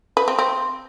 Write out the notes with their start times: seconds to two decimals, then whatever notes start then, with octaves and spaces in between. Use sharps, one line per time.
0.17 B4
0.28 C4
0.39 C4